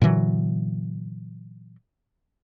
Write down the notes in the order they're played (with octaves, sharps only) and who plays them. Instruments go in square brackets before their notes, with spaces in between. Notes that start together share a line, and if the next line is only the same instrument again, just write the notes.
[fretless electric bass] A#2 D3 E3 F#3